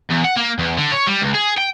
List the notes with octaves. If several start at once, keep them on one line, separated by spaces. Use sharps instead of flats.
E2
F#5
A#3
E2
D3
C#5
G3
C#2
G#4
G5